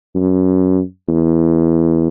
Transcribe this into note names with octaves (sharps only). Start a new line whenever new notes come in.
F#2
E2